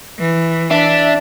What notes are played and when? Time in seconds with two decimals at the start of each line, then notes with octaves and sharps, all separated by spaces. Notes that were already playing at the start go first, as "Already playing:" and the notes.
0.19 E3
0.71 D4 E5